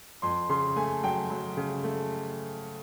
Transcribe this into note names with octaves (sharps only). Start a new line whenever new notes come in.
F2 C6
C#3 C6
A3 G#5
F#3 G5
F#3
C#3
A3